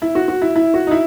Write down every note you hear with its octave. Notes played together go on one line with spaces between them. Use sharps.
E4
F#4
F#4
E4
E4
F#4
D#4
E4